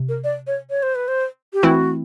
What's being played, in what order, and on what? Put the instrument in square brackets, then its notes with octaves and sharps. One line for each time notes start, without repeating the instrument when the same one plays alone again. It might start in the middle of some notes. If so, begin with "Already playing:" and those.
Already playing: [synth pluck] C3
[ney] A#4
D5
C#5
C#5
C5
B4
C5
G4
[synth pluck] E3 A3 C4 E4 [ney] F#4